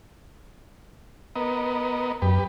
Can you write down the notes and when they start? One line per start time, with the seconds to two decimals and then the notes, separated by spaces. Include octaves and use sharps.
1.36 B3 A#4 D#5
2.22 F#2 G4 B4